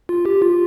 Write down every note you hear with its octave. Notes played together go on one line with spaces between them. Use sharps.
F4
G4
F4